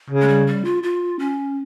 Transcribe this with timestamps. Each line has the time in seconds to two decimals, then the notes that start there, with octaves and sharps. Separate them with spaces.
0.11 C#3
0.21 G#3
0.28 G3
0.47 G3
0.65 F4
0.83 F4
1.19 C#4